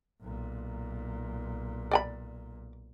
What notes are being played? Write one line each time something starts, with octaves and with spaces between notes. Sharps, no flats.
B1 A#2
D5 G5 B5